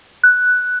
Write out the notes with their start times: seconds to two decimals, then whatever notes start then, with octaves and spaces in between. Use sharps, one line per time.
0.24 F#6